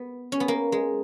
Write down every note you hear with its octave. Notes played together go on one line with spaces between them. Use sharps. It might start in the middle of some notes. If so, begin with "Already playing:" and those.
Already playing: B3
C#4
B3
A#3
G#3